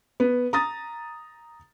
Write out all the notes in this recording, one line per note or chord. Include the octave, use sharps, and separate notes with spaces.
B3
A#5 D#6 A6